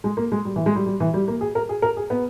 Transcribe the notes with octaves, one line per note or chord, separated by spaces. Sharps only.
G#3
A#3
G#3
G3
E3
G#3
G3
G3
E3
G3
A#3
G#4
A#4
G#4
A#4
G#4
B3